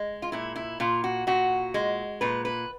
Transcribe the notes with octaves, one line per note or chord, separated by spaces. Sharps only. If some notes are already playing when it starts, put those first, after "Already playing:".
Already playing: G#3
F4
A#2 E4
E4
A#2 F4
F#4
A#2 F#4
G#3
A#2 B4
B4